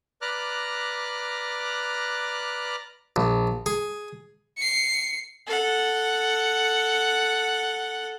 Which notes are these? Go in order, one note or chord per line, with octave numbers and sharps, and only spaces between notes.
B4 D5 A#5 D6 F6 F#6
A#1
G#4
C7 C#7
A4 F#5